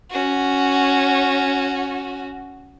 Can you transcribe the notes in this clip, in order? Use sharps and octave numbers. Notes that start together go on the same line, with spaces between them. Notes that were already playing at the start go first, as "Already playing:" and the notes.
C#4 F#4